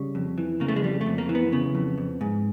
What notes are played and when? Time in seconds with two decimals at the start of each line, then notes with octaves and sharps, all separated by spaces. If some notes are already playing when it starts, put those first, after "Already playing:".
Already playing: C#3 G3
0.15 F2
0.38 E3
0.60 C#3 A#3
0.68 A3
0.76 G#3
0.83 F2 G3
1.01 A3
1.06 F2
1.18 A#3
1.29 E3
1.35 B3
1.52 C#3 B3
1.75 F2
1.98 F2
2.21 G#2